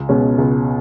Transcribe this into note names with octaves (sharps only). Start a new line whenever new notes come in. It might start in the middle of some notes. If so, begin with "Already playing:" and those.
Already playing: C#2
B2 G#3 C#4
C#2